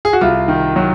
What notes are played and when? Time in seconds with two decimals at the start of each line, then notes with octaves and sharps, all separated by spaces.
0.05 G#4
0.13 F#4
0.21 C2 F4
0.48 D#3
0.76 F#3